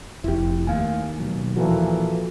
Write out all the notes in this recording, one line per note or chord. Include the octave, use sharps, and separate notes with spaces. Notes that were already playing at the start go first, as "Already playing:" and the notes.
F1 F2 E4 G4
D#2 A3 F5 G#5
B2 F#3
A#2 E3 F3 F#4 A4